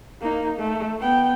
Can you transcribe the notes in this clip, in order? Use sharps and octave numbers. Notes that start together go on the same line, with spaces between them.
A#3 D#4
A3
B3 G5